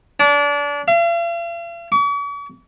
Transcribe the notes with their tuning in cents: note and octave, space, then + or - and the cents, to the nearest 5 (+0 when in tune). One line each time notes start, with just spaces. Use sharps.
D4 -30
F5 -45
C#6 +45